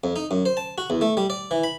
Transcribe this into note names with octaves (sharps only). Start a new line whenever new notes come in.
F2
D#4
F#2
C5
A5
F#4
E2
A3
G3
D5
E3
B5